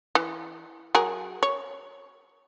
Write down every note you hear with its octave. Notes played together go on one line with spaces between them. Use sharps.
E3
F#3 G#4 A#4
C#5